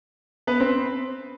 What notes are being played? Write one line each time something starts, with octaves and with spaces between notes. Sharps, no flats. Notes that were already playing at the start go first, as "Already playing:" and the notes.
B3 B4
C4 C5